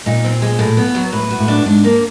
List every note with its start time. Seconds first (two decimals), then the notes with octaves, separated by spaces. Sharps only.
0.06 A#2 D#4
0.24 C4
0.42 G#3
0.59 A2
0.77 B3
0.95 F#3
1.12 A2 B4
1.31 F#4
1.39 A2
1.48 D4
1.66 G#2 D4
1.84 A#3